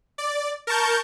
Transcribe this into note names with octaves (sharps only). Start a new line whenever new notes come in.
D5
A#4 A5 C#6 G6